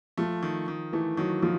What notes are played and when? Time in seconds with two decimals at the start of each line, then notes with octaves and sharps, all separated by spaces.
0.18 F3 A3
0.43 D#3
0.68 D#3
0.93 E3 A3
1.17 D#3 F#3
1.42 D#3 F3